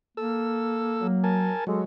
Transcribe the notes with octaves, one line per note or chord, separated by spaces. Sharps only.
A#3 A4 E6
F#3
A#4 G#5 A5
F#3 G#3 G4 A4